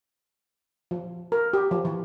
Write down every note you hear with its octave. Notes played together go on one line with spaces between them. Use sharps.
F3
A#4
G4
F3
E3